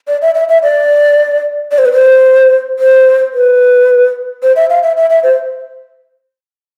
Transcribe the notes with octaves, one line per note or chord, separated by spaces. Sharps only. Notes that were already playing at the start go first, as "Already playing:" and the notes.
D5
E5
E5
E5
D5
D5
C5
B4
C5
C5
B4
C5
E5
F5
E5
E5
E5
C5